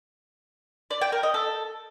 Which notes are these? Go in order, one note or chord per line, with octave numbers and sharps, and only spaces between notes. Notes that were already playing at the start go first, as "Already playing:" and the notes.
D5
G5
A#4
D#5
A4